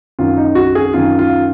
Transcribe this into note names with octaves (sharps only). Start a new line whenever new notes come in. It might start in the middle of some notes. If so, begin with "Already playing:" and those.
F#2 D#3 F4
D#4
F#4
G#4
F#2 D#3 F4
F4